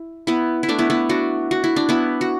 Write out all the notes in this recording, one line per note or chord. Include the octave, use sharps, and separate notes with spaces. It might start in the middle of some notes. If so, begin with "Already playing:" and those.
Already playing: E4
B3 E4
E4
A3 D4
B3 E4
B3 E4
D4 F#4
F#4
E4
D4
B3 E4
F#4